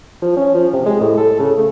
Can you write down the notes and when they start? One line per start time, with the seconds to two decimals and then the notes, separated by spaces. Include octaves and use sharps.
0.22 F3
0.36 C#4
0.54 F3
0.73 C3
0.86 G#3
1.00 A2
1.17 A4
1.39 C#3
1.57 A3